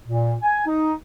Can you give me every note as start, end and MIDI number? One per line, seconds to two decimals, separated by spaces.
0.08 0.34 46
0.42 0.65 80
0.66 0.93 63